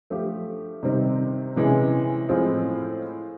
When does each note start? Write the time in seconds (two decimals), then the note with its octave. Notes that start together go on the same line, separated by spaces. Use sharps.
0.10 F3 A3 D4 G4
0.83 C3 D#3 G3 C4 D#4
1.56 C3 E3 G#3 C#4
2.29 A2 F3 G#3 C4 F4